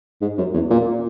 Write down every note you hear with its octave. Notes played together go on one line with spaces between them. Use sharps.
G#2
F#2
E2
A#2